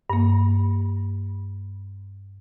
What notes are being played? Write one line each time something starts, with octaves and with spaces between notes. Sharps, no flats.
G2 A#3